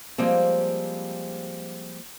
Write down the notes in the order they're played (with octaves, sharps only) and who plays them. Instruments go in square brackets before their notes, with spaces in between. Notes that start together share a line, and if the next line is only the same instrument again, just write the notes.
[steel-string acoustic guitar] F3 G3 G#3 A#3 C4